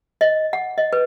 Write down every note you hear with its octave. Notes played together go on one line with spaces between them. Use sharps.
D#5
F#5
D#5
B4